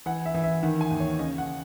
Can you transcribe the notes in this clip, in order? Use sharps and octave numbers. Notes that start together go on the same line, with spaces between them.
E3 F#5
E5
E3
E5
D#3 F#5
G#5
D#2
C#5
C#3 D#5
F#5